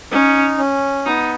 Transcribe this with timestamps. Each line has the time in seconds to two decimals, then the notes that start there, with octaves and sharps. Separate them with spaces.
0.11 C#4 D#4
0.58 C#4
1.06 B3 D#4